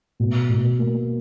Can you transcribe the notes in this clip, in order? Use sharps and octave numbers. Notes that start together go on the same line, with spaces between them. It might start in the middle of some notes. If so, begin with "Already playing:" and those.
B2
B2
A#3